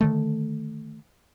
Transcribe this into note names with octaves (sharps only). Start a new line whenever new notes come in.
D3 D#3 A3